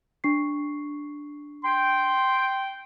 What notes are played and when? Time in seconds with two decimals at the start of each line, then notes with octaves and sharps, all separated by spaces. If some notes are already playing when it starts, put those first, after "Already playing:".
0.24 D4 C#6 C7
1.64 G5 C6